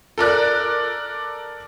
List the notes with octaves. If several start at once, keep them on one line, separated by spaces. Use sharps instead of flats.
A4 A#4 D5 F#6